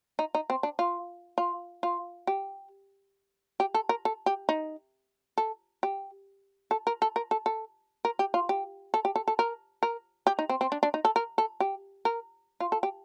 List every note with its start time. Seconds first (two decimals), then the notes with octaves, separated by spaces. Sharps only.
0.19 D#4
0.35 D#4
0.50 C4
0.63 D4
0.79 F4
1.38 F4
1.83 F4
2.27 G4
3.60 G4
3.74 A4
3.89 A#4
4.05 A4
4.26 G4
4.49 D#4
5.38 A4
5.83 G4
6.71 A4
6.87 A#4
7.02 A4
7.16 A#4
7.31 A4
7.46 A4
8.05 A#4
8.19 G4
8.34 F4
8.49 G4
8.94 A4
9.05 G4
9.16 A4
9.28 A4
9.39 A#4
9.83 A#4
10.27 G4
10.39 D#4
10.49 C4
10.61 C4
10.72 D4
10.83 D4
10.94 D#4
11.05 A4
11.16 A#4
11.38 A4
11.60 G4
12.05 A#4
12.60 F4
12.72 A4
12.83 G4